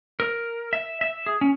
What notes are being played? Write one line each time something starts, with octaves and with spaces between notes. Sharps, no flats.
A#4
E5
E5
G#4
C#4